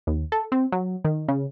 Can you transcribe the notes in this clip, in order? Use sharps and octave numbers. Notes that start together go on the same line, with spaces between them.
D#2
A4
C4
F#3
D#3
C#3